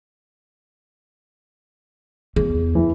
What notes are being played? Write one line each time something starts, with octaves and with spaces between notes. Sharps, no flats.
E2 G#4
E3